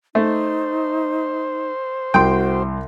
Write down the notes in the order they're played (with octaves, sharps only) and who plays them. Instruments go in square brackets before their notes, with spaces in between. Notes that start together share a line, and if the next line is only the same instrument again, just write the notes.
[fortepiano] A3 [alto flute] D#4 [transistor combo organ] C5
[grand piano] C2 C6 [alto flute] F#4 [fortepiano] G5